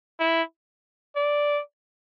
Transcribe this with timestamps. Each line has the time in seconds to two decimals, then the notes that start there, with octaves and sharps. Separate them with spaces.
0.20 E4
1.16 D5